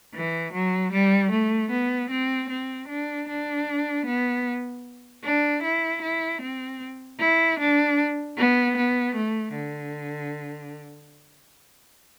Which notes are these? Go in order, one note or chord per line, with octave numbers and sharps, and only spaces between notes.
E3
F#3
G3
A3
B3
C4
C4
D4
D4
B3
D4
E4
E4
C4
E4
D4
B3
B3
A3
D3